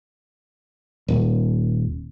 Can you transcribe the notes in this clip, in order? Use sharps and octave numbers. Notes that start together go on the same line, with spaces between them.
D#1